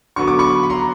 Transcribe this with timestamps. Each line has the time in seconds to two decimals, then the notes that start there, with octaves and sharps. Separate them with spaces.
0.16 D3 F#3 B3 C#6
0.28 D6
0.39 B5 C#6
0.63 B5
0.70 A#5 C6